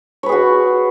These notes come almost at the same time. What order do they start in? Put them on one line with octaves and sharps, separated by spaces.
C#5 B4 G#4 F#4